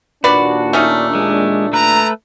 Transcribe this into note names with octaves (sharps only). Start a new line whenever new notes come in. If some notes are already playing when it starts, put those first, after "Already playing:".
D#2 A#2 D4 F#4 B4 D5
A3 C#4 D#4
G#3
A3 A4 B4 A#5